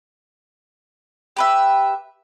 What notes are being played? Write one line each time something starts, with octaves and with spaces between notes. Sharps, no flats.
G4 B4 E5